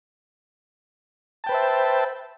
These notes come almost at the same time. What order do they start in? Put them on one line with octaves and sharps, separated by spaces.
A5 G5 B4 C5 E5